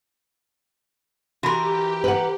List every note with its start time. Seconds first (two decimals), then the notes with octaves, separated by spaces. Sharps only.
1.43 E3 F#4 G4 A#4 B5 C6
2.04 B4 F#5